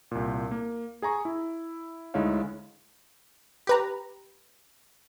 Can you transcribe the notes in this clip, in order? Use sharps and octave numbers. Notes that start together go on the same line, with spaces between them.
C2 A#2
A#3
G#4 G#5 A#5 C#6
E4
D2 G#3 D#4 E4 C#5 F5
G4 B4 A#5